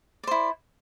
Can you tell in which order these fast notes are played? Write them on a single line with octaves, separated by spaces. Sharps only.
D5 C5 E4